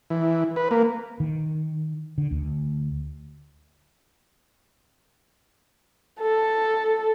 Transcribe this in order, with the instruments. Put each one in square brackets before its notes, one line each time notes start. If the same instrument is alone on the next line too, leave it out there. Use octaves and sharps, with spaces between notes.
[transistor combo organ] E3
B4
A#3
[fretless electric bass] D#3
D3
D2
[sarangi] A4